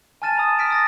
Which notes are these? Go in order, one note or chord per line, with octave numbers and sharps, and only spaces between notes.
G#5 A5 F6 A6 D#7 E7
G#5 A#5 D#6
F6 B6 D7
D#6 A6 A#6